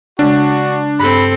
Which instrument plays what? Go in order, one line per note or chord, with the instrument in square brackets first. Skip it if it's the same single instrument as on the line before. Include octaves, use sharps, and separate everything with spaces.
[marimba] C#3 G#3 [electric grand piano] D4 [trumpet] F#4
[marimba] G2 F#6 [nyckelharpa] C4 A4 [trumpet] B5